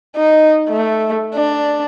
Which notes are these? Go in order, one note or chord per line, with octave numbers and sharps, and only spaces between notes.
D#4
A3
D4